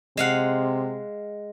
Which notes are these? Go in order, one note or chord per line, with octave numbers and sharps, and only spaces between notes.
C3 G#3 F5 F#5